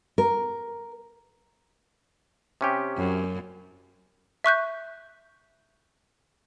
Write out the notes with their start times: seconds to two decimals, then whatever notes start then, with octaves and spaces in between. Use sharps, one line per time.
0.18 A#4
2.61 C3 C#4 G4
2.97 F#2
4.44 E5 C#6 F#6 G6